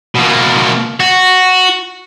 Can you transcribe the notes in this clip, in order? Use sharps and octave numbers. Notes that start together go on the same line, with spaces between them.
B2 A#3
F#4